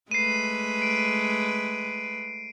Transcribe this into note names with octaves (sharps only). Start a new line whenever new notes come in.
G#3 A3 B4 C7 D#7
D7